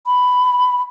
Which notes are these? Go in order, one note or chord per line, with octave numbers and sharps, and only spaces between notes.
B5